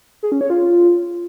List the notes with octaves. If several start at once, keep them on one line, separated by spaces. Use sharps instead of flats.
G#4
C#4
C#5
F4